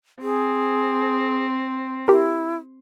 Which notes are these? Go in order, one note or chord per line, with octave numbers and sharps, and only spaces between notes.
C4 G#4
E4 G4 A#4